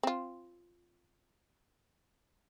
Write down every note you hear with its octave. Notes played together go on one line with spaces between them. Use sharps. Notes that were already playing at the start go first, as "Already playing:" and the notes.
C4 F4